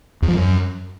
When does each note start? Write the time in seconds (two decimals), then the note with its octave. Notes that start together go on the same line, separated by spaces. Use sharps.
0.22 E2
0.28 F3
0.34 F#2